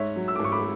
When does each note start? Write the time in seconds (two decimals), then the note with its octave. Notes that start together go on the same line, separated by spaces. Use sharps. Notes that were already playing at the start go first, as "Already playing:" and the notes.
Already playing: G#2 C#5 E5
0.16 F#3
0.28 E6
0.36 D6
0.39 G#1 C#6
0.52 B5 D6